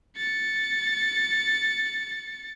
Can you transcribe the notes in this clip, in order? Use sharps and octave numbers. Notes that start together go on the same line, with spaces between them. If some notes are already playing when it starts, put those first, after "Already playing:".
A6 C#7